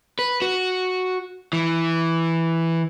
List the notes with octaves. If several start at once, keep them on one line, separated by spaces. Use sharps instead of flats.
B4
F#4
E3